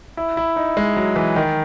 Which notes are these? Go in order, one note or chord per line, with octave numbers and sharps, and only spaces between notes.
E4
E4
D#4
G#3
F#3
E3
D#3